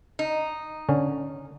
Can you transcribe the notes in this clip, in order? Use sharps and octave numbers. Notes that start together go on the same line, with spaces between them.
D#4
D3 C#4